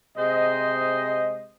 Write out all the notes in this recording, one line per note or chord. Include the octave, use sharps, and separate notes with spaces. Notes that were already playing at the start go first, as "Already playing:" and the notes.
C3 G#3 C5 D#5